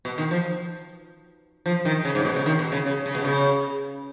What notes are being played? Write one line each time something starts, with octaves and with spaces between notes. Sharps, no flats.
B2
D#3
F3
F3
D#3
C#3
G#2
B2
C#3
D#3
B2
C#3
C#3
C#3
B2
C#3